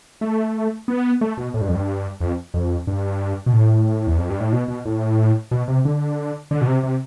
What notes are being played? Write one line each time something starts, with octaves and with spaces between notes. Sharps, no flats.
A3
B3
A3
B2
A2
G2
F2
G2
F2
F2
G2
B2
A2
E2
F2
G2
A2
B2
B2
A2
B2
C3
D3
D3
B2
C3
C3